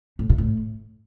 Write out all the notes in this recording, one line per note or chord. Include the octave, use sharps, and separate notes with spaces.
A2
A#2
A2